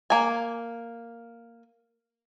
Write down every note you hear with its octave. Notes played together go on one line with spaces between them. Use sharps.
A#3 G#5